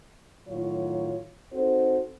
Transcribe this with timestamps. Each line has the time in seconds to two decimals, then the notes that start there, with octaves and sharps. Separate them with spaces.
0.48 A2 D#3 F#3 F4 C#5
1.52 C4 D#4 F#4 A4 C5